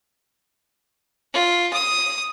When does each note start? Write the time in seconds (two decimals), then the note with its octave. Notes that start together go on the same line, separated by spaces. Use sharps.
1.33 F4
1.73 D#6